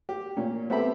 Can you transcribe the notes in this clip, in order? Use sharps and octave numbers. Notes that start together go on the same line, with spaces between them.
G4
A#2 C#4
B3 C4 G4 A4 E5 B5